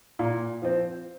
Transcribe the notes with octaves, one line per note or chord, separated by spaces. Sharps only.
A#2
F3 C4